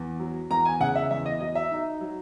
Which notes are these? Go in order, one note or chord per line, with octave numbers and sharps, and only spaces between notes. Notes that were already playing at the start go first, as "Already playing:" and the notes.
Already playing: E2
F#3
E2 A#5
G#5
C#3 F#5
E5
E2 E5
D#5
F#3 D#5
E5
D#4
F#3